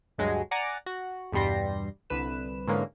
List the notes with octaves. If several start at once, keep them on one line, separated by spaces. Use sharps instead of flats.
D2 G2 F#3 G#3
D5 F#5 G#5 A#5 D6
F#4
E2 G2 B2 G3 C6 A#6
C2 D3 B4 E7
G#2 D3 E3 G#3 A#3 C#4